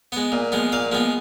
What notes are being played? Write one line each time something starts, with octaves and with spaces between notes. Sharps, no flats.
G#3 B3 F#5
A#2
F3 G#3 B3
A#2 F5
F3 G#3 B3